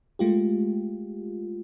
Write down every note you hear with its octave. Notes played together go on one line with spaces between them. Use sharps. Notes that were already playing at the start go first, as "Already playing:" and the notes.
G#3 A3 F4 G4